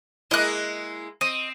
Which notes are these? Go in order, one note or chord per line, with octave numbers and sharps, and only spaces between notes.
G#3 A#3 E4 D#5 F#6
C4 D#5